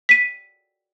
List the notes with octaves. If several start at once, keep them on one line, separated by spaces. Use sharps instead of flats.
B6 D#7